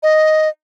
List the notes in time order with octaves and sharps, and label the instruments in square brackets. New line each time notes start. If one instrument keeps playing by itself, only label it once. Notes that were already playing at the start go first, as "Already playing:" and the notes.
[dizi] D#5